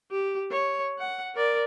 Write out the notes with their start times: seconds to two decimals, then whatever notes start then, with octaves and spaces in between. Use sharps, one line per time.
0.11 G4
0.51 C#5
0.98 F#5
1.35 A#4 D5